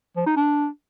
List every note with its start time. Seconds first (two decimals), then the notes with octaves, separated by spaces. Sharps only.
0.16 F3
0.27 D#4
0.37 D4